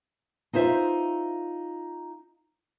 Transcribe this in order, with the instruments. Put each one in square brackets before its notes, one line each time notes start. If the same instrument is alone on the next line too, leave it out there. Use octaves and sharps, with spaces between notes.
[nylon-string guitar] D#4 F4 C5 E5